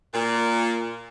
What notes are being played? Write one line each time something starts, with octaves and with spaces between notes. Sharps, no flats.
A#2